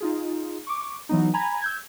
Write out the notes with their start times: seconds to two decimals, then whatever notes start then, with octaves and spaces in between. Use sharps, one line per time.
0.01 D#4 F4 G#4
0.67 C#6 D6
1.09 E3 F#3 B3 D#4
1.34 G#5 A#5 B5 G#6
1.62 E6 G6 G#6